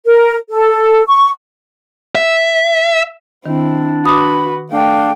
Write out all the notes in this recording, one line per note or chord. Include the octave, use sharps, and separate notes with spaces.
A#4
A4
C#6
E5
D#3 C4 D4 E4
F#4 B4 B5 D6 D#6
A3 D4 F5 G5